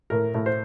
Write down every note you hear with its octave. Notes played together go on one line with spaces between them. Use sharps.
A2 A#4
A2
C5